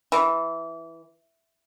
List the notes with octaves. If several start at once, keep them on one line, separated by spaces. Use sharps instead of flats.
E3